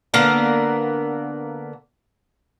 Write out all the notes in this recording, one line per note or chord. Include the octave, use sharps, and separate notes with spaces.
D3 A#3 B3 A#4